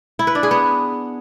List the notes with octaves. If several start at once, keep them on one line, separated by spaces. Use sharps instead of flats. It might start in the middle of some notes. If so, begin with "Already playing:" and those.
E4
B4
D4
G#4
B3